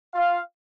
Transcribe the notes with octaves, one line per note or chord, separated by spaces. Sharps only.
F4 F5